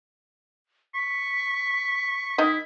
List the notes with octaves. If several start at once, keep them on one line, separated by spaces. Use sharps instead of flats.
C#6 B6
D#3 D#4 E4 D#5